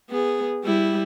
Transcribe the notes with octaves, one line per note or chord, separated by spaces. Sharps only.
B3 G#4
G3 E4